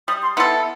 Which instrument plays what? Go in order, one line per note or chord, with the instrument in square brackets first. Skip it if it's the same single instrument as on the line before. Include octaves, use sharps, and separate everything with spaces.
[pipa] G3 [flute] D#6
[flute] C6
[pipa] B3 E4 A4 [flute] C6